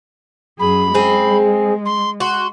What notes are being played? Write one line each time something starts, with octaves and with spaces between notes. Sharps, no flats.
F#2 G#4 B5
G#3 C4 G#4
C6
F#4 C6